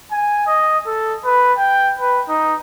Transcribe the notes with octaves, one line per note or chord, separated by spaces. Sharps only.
G#5
D#5
A4
B4
G5
B4
D#4